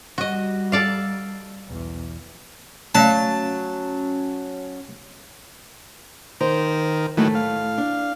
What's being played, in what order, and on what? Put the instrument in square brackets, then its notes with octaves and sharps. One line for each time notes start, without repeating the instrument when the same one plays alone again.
[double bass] G3 [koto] F#4 D#5
[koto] A4 D5 F5
[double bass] B1 E2
[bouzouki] F#3 [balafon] A3 D5 F5 [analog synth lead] C#4 [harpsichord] A5
[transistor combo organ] D#3 A#4 [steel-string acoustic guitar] C5
[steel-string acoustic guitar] A2 A3 [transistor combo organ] D#3 E3 F#3
[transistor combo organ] F5
[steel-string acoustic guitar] D4